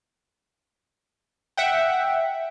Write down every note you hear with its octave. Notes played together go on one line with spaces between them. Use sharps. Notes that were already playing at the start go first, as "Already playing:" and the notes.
E5 F#5 G5